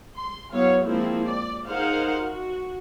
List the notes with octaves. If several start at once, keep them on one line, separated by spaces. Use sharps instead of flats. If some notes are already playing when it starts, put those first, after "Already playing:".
C6
F#3 B3 E4 C#5 F5
F3 G#3 A#3 C4 E4
D5
D#4 G#4 A#4 C5 F5 F#5
F#4